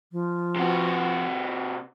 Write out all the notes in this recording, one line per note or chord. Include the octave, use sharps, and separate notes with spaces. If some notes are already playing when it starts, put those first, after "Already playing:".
F3
C3 F#4